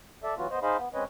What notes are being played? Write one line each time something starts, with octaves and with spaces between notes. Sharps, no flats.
A4 D5 E5
E3 F#3 B3 F4 F#4
B3 C5 D#5
D#4 G#4 C5 D#5 F5 B5
B3
G#3 C4 C#4 B4 C#5 D#5